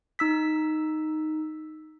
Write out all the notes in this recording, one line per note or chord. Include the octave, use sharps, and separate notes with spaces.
D#4 E6 B6